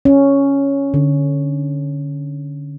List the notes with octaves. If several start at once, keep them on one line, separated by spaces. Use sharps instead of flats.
C#4
D3